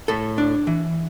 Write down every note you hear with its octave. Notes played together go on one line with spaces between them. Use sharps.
A2 A4
D4
E3